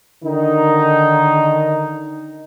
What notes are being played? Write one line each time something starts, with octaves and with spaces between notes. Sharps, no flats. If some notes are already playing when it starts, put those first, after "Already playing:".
D3 D#3 D#4